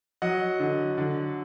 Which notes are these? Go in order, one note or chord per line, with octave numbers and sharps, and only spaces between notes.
F#3 D#5 F#5
D3
D3